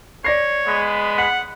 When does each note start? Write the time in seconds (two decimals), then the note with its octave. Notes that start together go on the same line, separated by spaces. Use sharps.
0.25 C#5 D5 A#6 C7
0.66 G#3 B3 B5
1.18 F#5 B6